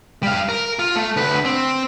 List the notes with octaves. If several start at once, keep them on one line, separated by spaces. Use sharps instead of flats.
G3 F5
A#4
F4
A3
D2 B4
C4